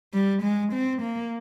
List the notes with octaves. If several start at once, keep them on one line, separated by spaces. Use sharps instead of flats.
G3
G#3
C4
A#3